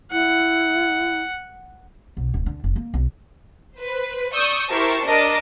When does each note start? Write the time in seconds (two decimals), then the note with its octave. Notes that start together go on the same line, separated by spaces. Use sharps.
0.12 E4 F#5
2.17 B1
2.34 D1
2.46 D3
2.64 F1
2.76 A#3
2.94 B1
3.77 B4 C5
4.33 D5 C#6 D#6 E6 G6
4.69 E4 G4 A#4 C5 A5 C#6
5.04 D4 A#4 D#5 A5 D6